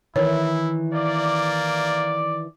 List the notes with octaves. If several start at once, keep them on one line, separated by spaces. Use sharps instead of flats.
D#3 E3 E4 C#5
A#3 D5